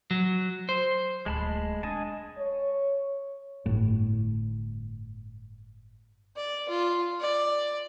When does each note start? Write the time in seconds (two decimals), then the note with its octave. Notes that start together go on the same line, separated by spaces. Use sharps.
0.11 F#3
0.69 C5
1.26 D1 G#3 A5 B5
1.83 D4 D#5 G#5 A5
2.38 C#5
3.66 G1 A2
6.36 D5
6.69 F4
7.20 D5